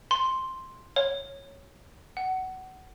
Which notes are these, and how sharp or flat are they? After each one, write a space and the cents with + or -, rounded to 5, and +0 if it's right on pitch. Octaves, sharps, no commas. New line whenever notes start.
C6 +5
C#5 -5
F#5 +20